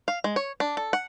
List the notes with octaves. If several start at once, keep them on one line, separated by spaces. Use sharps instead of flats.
F5
G#3
C#5
D4
A4
F#5